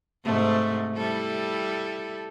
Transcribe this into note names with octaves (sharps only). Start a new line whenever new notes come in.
G#2 C3 A3
G3 E4 A4